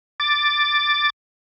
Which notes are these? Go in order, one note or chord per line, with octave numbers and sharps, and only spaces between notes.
D6 A6